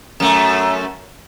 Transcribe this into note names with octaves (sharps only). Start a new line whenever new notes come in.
F#2 A3